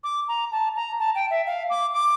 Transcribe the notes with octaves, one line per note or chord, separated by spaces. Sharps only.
D6
A#5
A5
A#5
A5
G5
E5
F5
D6
D6